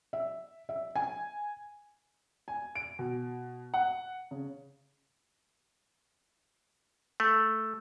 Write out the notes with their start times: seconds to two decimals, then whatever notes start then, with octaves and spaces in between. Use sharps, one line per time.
0.13 E5
0.69 E5
0.96 G#5
2.48 G#5
2.75 D7
2.99 B2
3.74 F#5
4.31 C#3
7.20 A3